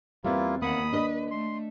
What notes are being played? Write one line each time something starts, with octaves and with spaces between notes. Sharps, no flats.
E2 G3 A#3 C4 E4 F4
D#2 A#3 F#5 B5 D#6
D4 B4 D#5
A3 C6